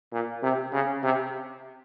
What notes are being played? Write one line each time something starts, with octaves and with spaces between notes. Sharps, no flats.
A#2
C3
C#3
C3